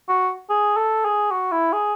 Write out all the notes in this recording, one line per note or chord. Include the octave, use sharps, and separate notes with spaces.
F#4
G#4
A4
G#4
F#4
E4
G#4